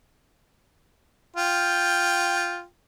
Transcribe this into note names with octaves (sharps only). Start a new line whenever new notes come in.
F4 G5